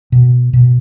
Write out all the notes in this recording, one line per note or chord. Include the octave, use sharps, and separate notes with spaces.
B2
B2